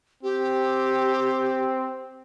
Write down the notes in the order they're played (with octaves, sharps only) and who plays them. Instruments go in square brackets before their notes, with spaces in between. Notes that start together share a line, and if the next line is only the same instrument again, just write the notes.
[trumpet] C4 [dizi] G4